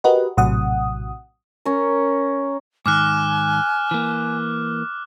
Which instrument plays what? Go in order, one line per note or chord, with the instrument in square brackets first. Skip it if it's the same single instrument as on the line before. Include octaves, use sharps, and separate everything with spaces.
[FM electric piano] F#4 G4 A#4 B4 D#5 F#5
A#1 A2 C3 F#3 F#5 D#6
[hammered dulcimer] C#4 A#4
[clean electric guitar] G#2 D#3 [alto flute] G#5 [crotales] D6 F6 F#6
[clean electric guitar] E3 A#3